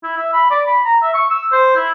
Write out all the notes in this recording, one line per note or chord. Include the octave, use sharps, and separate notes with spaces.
E4
E5
B5
D5
B5
A#5
E5
C#6
E6
C5
E4